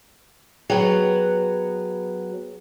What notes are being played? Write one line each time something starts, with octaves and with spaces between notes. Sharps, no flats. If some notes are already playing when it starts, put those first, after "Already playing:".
F#3 B3 G#4 G5 F7